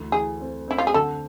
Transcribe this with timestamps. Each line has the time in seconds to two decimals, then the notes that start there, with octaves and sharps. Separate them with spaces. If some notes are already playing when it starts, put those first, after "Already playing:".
Already playing: D2 E3
0.12 E3 G#4
0.40 C4
0.68 C4 E4
0.78 F4
0.87 G#4
0.94 D3 A4